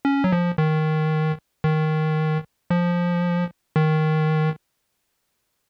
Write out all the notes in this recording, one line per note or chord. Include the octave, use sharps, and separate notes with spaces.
C#4
F#3
F3
D#3
D#3
F3
D#3